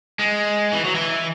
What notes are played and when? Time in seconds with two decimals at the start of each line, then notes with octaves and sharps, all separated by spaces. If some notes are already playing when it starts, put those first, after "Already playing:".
0.19 G#3
0.73 E3
0.84 F#3
0.95 E3